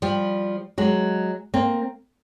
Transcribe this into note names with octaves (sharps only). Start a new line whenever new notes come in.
F3 G3
F#3 G#3
A#3 C4